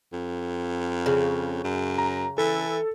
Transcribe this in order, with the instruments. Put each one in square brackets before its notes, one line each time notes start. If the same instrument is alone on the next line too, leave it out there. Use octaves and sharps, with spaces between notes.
[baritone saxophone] F2
[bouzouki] C#3
[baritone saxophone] F#2
[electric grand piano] A#5
[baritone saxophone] E3 [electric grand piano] A4